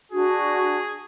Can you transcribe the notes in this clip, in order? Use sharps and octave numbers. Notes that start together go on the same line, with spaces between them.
D4 F#4 G#4